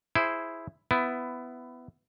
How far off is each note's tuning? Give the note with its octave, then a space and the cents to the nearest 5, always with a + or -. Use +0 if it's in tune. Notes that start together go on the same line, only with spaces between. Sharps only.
E4 +0 G#4 +0 C5 +0
B3 +20 E4 +10